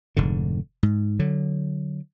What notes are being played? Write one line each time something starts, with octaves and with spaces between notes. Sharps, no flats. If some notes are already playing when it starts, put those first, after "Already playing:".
F1 G#2 D3
G#2
D3 F#3